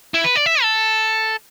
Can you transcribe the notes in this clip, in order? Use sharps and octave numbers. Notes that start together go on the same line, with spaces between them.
E4
B4
D5
E5
A4